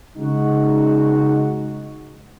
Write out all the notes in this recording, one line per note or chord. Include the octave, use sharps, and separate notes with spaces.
C#3 G#3 D#4 F#4